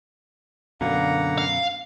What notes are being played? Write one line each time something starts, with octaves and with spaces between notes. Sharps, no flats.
F#2 B2 D3 A#3 F#5 A#5
F5